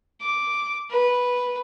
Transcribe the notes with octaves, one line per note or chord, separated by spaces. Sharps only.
D6
B4